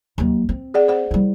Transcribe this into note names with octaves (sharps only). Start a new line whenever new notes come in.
D#2 F#3
C4
G#4 D5 F#5
C5 F#5
G3 E4